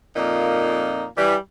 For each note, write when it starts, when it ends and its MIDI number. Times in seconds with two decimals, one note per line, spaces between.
0.16 1.05 41
0.16 1.05 46
0.16 1.05 58
0.16 1.05 63
1.18 1.36 52
1.18 1.36 55